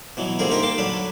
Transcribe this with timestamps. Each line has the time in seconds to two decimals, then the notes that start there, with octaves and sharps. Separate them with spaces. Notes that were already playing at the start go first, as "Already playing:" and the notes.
0.17 B2 E3 F#3
0.39 A#2 D3 C4 G#4 A#4
0.51 A#3 C4 D#4 G4 A#4
0.63 F5 G5 A5
0.78 D3 F#3 D4 B4